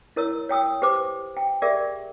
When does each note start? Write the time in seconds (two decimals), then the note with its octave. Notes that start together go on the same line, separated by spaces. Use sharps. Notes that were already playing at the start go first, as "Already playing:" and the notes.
0.16 E4 A#4 C#5 E6
0.49 C#5 G5 D#6 E6
0.82 G4 B4 C5 D6
1.37 G5
1.62 G4 G#4 A#4 D5 E5